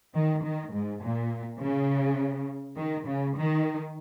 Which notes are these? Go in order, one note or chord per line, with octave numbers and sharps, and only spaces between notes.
D#3
D#3
G#2
A#2
C#3
D#3
C#3
D#3